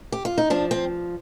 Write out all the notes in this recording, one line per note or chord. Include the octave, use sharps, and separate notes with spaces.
G4
F4
D#4
F3 D4
C4